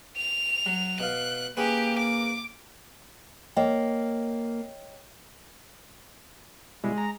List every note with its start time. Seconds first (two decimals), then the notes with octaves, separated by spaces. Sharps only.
0.17 F7
0.66 F#3
1.00 B2 F5 F#6
1.57 A#3 C#4 G4 G#4 B4
1.98 D6
3.57 A#3 C#5 D#5 G5
6.84 B2 G3 G#3 E4
6.98 A#5